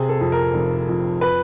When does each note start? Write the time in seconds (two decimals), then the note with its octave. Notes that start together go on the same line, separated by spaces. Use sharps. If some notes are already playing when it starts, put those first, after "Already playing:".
Already playing: C3 G#4
0.09 A4
0.21 F2
0.32 A#4
0.54 F1
0.88 F2
1.21 B4